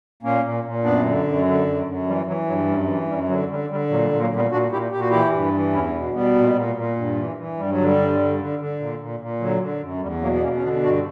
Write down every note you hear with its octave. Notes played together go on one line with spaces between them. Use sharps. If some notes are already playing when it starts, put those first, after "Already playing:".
A#2 A#3 C#4
A#2
A#2
F#2 B3 D4
D3
F#2
D3
F#2
F#2
E3 G3
E3 F#3
G2 F#3
F#2 G3
E3
F#2 G3
D3 F#3
D3 G3
D3 G3
A#2 F#3
G3
A#2
F#3 A#3
A#2 G3 B3
A#2 D4 F#4
A#2 E4 G4
A#2 G4
F#4
E3 E4 G4
G2
E3
E2 C#4 E4
B2
B2 G3 B3
A#2
A#2
A#2
G2
E3
E3
G2 G3
F#3
D3
G3
G2
D3
D3
D3
A#2
A#2
A#2
D3 F#3
D3
F#2
E2 G3
B2 F#3 A#3
B3
B2 A#3 C#4
C#4
D3 B3 D4
G2 D4 F#4